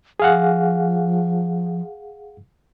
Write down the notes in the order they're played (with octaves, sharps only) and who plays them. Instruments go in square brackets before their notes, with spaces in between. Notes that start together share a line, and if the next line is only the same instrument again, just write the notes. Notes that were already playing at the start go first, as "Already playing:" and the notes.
[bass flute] F3 [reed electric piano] G#4 F5 F#5